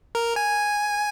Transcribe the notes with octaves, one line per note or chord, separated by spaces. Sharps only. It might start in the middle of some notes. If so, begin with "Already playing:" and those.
A#4
G#5